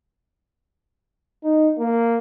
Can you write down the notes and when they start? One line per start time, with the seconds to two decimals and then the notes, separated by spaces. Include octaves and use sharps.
1.44 D#4
1.78 A#3